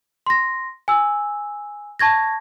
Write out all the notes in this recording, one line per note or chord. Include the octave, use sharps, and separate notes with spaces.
C6 A#6
G#5 E6
A5 C#6 G#6 A#6